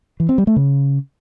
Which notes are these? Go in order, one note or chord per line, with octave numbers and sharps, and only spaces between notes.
E3
C4
G3
A3
C#3